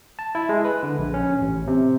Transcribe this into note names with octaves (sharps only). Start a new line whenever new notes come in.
A5
E4
G#3
B4
D3
A#1
C#4
A1
C3